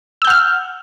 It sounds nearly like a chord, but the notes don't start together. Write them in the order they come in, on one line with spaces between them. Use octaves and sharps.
E6 G6 F#5 F6